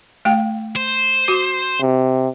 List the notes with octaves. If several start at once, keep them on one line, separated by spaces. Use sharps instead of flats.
A3 F5 G5
C5
F#4 D6
C3